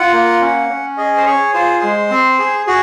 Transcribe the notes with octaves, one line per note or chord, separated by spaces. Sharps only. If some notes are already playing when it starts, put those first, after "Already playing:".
Already playing: F4 F#5
A#3
C#4
C#4
G#4 D#5
C5
G#4 C#5
F4 C5
G#3
C4
G#4
F#4 G#4